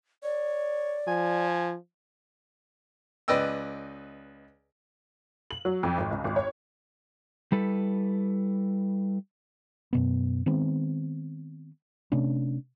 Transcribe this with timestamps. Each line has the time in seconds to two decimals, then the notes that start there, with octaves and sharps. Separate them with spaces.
0.23 C#5 D5
1.07 F3 G#5
3.28 C#2 B4 D5 D#5 G5 E6
5.51 F#7
5.65 F#3
5.83 F2
5.98 G#1
6.11 C#2
6.24 G#1
6.36 C#5
7.52 G3 E4 A4 B4
9.93 F#2 B2 B3
10.46 D#3 G#3 B3 C4
12.12 C3 A3 C#4 D4